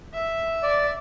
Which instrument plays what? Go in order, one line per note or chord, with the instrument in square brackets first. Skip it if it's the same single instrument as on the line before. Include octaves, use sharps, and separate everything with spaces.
[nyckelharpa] E5
[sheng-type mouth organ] D5